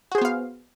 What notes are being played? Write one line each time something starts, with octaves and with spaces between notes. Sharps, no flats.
B3 F#4 G#4 C5 F5